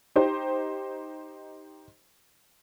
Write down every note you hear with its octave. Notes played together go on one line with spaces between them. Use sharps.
D#4 G4 C5